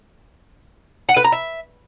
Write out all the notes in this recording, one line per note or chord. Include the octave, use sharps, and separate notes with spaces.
F#5
B4
A#5
E5